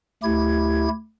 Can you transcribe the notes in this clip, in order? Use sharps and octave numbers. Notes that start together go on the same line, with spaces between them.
D2 A3 E4 G4 G#6